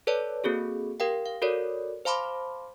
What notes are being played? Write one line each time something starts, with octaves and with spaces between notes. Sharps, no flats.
A4 B4 C#5 D5 A5
A#3 C4 F#4 G#4 A4
G4 A#4 F5 G5
F5
F#4 A4 A#4 C#5 D5
C5 F5 A5 B5 C6 D6